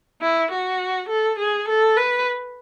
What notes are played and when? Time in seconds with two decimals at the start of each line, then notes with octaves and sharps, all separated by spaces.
0.22 E4
0.51 F#4
1.09 A4
1.39 G#4
1.68 A4
1.97 B4